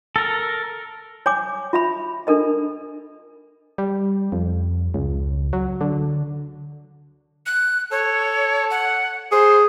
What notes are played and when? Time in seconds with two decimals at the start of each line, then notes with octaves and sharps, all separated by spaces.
0.16 A4 A#4
1.26 C#5 G#5 D6
1.73 F4 E5 B5
2.27 D4 A4 A#4 D#5
3.78 G3
4.32 F2
4.94 C#2
5.53 F#3
5.81 D3
7.46 F#6
7.91 A4 C#5
8.71 F#5
9.32 G#4 C5